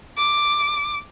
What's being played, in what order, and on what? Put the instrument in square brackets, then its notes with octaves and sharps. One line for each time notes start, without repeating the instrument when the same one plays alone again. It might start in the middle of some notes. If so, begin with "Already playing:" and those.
[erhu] D6